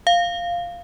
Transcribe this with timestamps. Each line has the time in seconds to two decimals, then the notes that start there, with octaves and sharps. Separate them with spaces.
0.07 F5